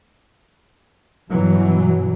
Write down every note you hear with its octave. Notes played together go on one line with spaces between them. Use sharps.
G2 B2 E3 F#3